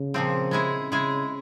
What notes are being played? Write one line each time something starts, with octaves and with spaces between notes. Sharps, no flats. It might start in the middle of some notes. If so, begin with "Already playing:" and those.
Already playing: C#3
A#2 F3 C4
G#3 E4 G#4
C#3 G#3 E4 G#4